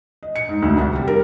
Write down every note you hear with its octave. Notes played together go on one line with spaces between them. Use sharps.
D#5
C#7
G#2
D2
C2
G3
A#4